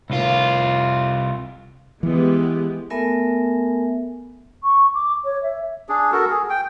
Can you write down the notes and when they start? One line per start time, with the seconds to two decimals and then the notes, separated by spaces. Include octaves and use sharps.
0.10 C2 F4
2.03 E3 G#3 B3 G4
2.90 A3 B3 A4 A#4 E5 G#5
4.63 C#6
4.94 D6
5.24 C#5
5.43 E5
5.89 D4 G#4
6.12 F#4 A4 A#4
6.30 G#4
6.50 G5